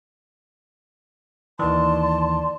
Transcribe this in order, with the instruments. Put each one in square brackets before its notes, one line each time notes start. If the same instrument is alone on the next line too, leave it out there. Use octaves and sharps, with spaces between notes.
[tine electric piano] D#2 D#3 E3 [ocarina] D5 [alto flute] A5 [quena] C6